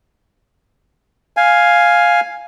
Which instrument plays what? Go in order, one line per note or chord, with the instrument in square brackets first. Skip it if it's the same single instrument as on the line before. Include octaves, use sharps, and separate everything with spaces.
[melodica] F5 G#5